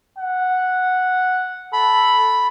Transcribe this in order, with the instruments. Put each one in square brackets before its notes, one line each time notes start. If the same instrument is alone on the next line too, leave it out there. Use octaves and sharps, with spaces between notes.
[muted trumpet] F#5
[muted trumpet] A4 [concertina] B5